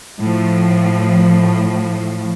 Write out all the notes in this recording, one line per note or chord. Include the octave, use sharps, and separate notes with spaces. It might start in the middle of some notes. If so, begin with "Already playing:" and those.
A2 F3